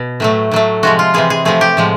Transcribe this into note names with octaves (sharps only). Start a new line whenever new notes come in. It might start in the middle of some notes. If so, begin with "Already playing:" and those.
Already playing: B2
A2 F#3 A3
A2 F#3 A3
C3 F3 G#3 F#4
F4
C3 E3 G#3 G#4
G#4
C3 F3 A3 G#4
G4
A2 F3 G#3